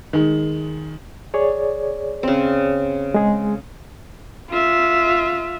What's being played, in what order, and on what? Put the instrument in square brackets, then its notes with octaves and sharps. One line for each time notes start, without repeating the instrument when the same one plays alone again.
[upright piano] D#3 G#3
[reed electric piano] G#4 C#5 D5
[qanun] C#3 C4
[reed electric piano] G#3 G#4
[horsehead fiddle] F4 E5